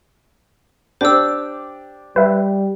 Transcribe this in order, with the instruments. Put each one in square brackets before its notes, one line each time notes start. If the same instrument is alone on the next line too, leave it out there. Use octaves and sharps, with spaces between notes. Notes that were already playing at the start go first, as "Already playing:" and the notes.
[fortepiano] D4 G4 [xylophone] C5 E6
[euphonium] G3 [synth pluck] B4 E5